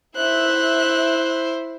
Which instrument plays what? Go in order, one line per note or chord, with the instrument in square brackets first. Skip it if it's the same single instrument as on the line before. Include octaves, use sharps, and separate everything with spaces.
[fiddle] E4 C5 [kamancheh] E5 F#6